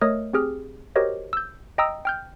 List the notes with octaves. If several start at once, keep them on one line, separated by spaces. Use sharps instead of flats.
A3 A#4 C#5 D#5 D#6 F6
C4 G4 G#4 F6
F#4 G4 A#4 C5 C#5 D#5
E6 G6
D#5 G5 A#5 D#6 E6
G5 F6 G6